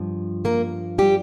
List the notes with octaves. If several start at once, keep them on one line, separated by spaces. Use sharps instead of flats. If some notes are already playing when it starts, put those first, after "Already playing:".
Already playing: G2 F3
A#3 A#4
G3 G4